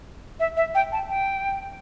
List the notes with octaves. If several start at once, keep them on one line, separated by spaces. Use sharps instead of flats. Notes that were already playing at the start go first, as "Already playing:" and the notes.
E5
E5
G5
A5
G5